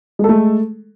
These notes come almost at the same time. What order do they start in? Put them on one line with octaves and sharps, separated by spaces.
G#3 A4 A3